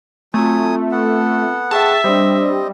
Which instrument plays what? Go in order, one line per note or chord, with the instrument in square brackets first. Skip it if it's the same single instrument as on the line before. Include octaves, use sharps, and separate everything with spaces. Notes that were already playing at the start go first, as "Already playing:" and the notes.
[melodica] F#3 G#5 D#6 [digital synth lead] A3 [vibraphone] C4 F4
[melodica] B3 F#5 [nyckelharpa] A4
[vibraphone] G#4 G5 C#6 [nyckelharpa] E5 [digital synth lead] A5
[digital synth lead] G3 [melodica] C4 D#5 [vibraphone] D4 C5